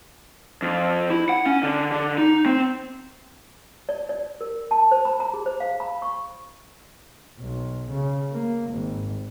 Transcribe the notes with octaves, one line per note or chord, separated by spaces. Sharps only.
F2
E4
F#5
C#4
D3
D3
D#4
C4
D5
D5
A#4
A5
C5
B5
A#5
G#4
C5
F5
B5
C#6
B1
C#3
A#3
G#1